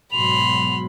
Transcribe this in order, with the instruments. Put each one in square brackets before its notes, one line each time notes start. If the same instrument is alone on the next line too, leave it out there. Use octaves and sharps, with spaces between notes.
[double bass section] G#2 B2 F#3 [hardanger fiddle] B5 C6 [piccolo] F7